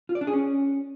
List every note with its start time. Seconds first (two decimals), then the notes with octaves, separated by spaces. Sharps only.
0.09 F4
0.15 D5
0.21 D4
0.27 G#4
0.33 C#4